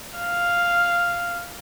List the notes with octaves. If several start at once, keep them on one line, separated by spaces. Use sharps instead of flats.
F5